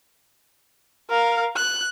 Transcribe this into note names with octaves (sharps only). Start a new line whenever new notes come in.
A#4 F5
F#6